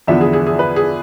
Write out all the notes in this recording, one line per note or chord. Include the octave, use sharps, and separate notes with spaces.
E2 D3 F3 B3 E5
G#4
G#4
G#4
B4
G#4